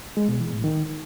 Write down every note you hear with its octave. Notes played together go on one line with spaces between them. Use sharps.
G#3
B2
E3
A2
D#3